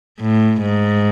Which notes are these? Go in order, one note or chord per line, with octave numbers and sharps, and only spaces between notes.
A2
G#2